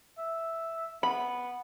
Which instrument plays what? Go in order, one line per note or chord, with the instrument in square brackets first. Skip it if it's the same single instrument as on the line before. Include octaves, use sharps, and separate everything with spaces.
[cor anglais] E5
[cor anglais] B3 [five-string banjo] B5